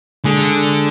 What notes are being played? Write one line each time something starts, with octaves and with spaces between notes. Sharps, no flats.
D3 G#3